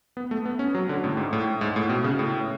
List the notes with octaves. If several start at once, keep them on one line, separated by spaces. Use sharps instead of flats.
B3
A3
B3
C#4
F#3
D3
A2
G#2
A2
G#2
A2
B2
C#3
A2